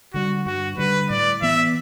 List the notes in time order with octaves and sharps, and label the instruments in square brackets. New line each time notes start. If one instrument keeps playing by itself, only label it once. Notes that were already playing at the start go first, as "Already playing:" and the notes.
[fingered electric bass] D3 G3 [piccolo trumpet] F#4
[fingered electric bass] G2 [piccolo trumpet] F#4
[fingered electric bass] D3 G3 [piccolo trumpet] B4
[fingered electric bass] A2 [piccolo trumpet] D5
[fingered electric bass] E3 B3 [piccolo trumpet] E5